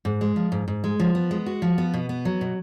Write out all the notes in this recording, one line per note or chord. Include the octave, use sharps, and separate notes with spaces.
G#2
G#3
F3
G#2
G#2
G#3
F3
B3
G#3
F#4
F3
B3
B2
B3
F#3
B2